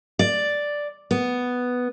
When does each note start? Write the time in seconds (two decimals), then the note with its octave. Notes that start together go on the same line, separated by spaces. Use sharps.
0.19 D5
1.11 B3